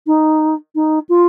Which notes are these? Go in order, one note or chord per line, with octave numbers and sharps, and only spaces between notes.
D#4
D#4
F4